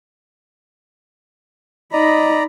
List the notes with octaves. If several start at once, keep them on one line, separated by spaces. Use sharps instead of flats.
D#4 D5 D#5 A#5 B5